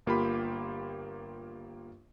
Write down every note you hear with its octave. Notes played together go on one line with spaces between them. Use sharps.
G1 A#3 F4 G4 B5